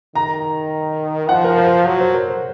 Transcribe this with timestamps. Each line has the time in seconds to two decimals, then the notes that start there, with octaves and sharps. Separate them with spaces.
0.15 D#3 A#5
1.29 F3 F#5
1.44 A#4
1.58 C5
1.87 F#3
2.01 C5
2.14 A#4
2.29 C5